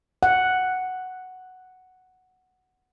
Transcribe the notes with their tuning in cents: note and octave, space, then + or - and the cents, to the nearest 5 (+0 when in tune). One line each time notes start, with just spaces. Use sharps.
F#5 +0